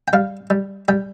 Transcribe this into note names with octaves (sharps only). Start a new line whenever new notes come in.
G5
G3 F5
G3
G3 G5